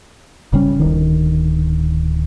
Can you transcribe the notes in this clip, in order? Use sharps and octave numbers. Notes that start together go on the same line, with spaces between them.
G#1 C#3 G3 C#4
D1 D#3